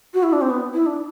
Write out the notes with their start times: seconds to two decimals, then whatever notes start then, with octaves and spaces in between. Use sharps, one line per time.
0.14 F#4
0.23 E4
0.33 D4
0.41 C4
0.50 B3
0.74 E4
0.86 D4